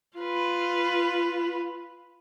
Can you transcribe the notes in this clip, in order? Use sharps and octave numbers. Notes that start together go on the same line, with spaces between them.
F4 B4